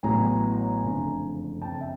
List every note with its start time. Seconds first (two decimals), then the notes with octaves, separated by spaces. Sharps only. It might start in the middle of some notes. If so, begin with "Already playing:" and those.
0.03 A1 A2 F#3 B3 G#5 A#5
0.83 F#1 F2 D3 F3 A3
1.61 F#1 F2 C#3 G5 A5
1.81 E5